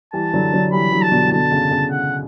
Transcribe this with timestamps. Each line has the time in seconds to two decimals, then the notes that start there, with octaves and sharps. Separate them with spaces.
0.13 E3 G3 A5
0.33 D3 F#3
0.53 D3 F#3
0.72 E3 G3 B5
0.92 D3 F#3
1.02 A5
1.12 B2 D3
1.28 E3
1.32 B2 D3 A5
1.52 C#3
1.71 C#3
1.91 F#5